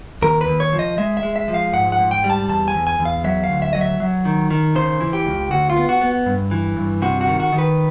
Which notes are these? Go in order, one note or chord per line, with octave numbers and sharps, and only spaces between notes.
D#2 A#4
B4
D#2
C#5
F3
D#5
G#3 E5
E5
G#3
E5
F3
F5
G#2 F#5
F#5
G#2
G5
G3
A5
E2 A5
G#5
E2
G#5
E2
F5
F#3 E5
F5
D2
E5
F#3 D#5
E5
F#3
D#3
D#3
C#3 C5
E3
G4
C#2
D2 F#4
F4
B3
F#4
B3
G2
E3
G2
C3 F#4
F#4
D#3
F#4
D#3
B4